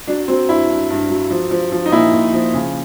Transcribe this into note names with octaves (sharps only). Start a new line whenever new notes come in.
F#3 D4
F#3 C4
G2 E4
G2
G2
F#3
F3
F3
F3
D#4
A#2 E4
A#2
F3
C#3